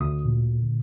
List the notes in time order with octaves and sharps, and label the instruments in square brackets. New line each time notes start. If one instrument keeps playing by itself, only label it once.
[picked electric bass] D2 [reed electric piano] D#6
[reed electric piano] A#2 D3